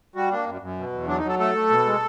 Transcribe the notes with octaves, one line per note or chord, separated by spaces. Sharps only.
G3 F#4
A#3 D4
F#2
F#2
B2
E2
F#3 D4
D#4
F#3
A4
A3 A4
A3
B2
G#3